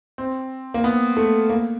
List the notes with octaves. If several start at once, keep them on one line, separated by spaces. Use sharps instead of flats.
C4
A#3
B3
A3
A#3